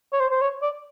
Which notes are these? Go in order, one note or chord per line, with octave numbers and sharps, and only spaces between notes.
C#5
C5
C5
C#5
D5